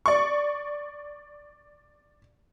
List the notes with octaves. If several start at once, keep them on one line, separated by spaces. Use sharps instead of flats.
D5 C#6